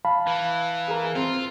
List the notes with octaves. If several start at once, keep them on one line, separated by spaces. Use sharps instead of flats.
F5 A5 B5
E3
G#4 A#4
C4 F4